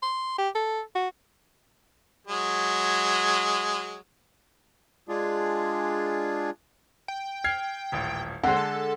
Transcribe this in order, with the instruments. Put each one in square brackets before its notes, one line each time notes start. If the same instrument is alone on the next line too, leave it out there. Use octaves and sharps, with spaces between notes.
[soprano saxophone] C6
G4
A4
F#4
[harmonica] F#3 G#3
[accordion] G#3 D4 F4 G#4
[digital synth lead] G5
[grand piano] F6 G#6 C7
D#1 A1
[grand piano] D3 G#3 [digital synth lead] C4 [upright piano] F#5 C6
[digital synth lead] A4